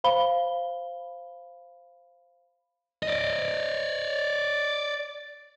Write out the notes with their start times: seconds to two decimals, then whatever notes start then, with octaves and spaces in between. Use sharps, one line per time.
0.04 C5 F5 B5 G7
3.03 D5 D#5